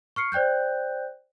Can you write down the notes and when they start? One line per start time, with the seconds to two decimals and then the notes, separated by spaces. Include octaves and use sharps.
0.16 C#6 F6 C7 C#7
0.32 C5 D5 G5 F#6 G6